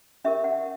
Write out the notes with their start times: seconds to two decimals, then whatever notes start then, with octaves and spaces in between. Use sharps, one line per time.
0.25 C#4 G4 A#4 E5
0.44 F#5